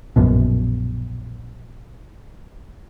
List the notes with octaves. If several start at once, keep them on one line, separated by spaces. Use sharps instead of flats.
A#1 F#2 B2